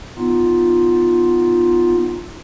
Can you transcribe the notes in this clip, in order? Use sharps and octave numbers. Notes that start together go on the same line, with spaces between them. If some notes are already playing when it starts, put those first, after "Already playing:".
B3 D#4 F4